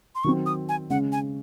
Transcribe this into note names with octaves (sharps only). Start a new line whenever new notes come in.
C6
D#3 F#3 C4 C#6
D#6
G#5
C#3 G#3 C#4 F#5
G#5